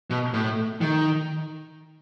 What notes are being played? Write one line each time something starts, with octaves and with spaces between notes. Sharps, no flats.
B2
A2
D#3